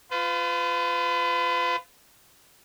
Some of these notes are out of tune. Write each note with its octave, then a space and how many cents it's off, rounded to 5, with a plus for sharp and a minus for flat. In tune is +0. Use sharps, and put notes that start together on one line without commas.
F4 +0 B4 +40